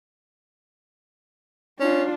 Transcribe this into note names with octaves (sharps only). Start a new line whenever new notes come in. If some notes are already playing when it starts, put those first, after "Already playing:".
C#4 D4 F4